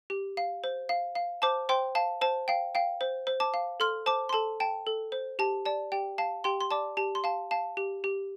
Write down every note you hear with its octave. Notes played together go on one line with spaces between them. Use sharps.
G4
F5
C5
F5
F5
C5 A5 D6
C5 G5 C6
F5 A5
C5 A5
F5 G5
F5 G5
C5
C5
A5 D6
F5
A4 C6 F6
C5 A5 D6
C6
A4 A5
G5 A5
A4
C5
G4 A5
D5 A5
G4 G5
F5 A5
G4 G5 C6
C6
D5 A5 D6
G4 A5
C6
F5 A5
F5 A5
G4
G4